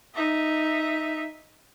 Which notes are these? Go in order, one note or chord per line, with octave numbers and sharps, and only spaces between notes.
D#4 E5